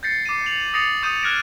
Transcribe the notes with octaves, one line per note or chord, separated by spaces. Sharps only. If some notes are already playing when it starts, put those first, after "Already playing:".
G6 A6 A#6 C7 C#7
D6 C7 D#7
C#7 F7 F#7
D#6 A6 A#6 C7 C#7 F7
C#6 D#6 G6 D#7
F6 F#6 G#6 A#6 D7 E7